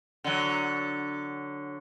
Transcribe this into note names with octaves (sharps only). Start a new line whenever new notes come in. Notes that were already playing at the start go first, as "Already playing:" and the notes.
D3 F#3